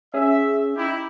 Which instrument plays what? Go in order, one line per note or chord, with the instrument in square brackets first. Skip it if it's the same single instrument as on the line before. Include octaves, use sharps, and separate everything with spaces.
[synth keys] C#4 G#4 [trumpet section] E5
[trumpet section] D#4 E4 G4